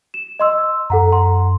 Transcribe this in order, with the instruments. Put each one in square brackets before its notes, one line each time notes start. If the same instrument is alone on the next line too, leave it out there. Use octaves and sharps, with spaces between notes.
[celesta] E7
D#5 C6 E6
[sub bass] F#2 [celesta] A4 F#5 A#5
[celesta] F#5 A#5 C6